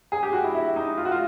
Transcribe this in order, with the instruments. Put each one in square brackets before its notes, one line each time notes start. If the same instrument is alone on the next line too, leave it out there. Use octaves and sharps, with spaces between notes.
[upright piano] G#4
G4
F#4
E4
E4
D#4
F4
F#4
F4